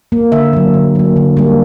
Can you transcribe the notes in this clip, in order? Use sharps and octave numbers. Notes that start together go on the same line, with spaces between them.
A#3
D3 E5
F#3 A#3
D3
F#3 A#3
D3
G3 A#3